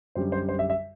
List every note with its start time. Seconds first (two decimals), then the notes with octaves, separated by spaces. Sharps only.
0.15 F#2 D3 G3 C5
0.32 C5
0.49 C5
0.59 E5
0.70 E5